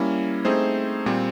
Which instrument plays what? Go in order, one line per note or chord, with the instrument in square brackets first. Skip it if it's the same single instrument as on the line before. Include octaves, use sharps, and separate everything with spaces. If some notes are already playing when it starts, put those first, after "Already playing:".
Already playing: [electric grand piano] G3 A#3 C#4 E4
A3 C4 D#4 G#4 C5
A#2 G3 C4